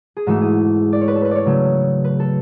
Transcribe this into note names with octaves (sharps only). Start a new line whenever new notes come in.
G#4
G#2 E3 A3 F#4
G#4
D5
C#5
B4
A4
B4
C#5 D5
C#3 F#3 A3
B4
A4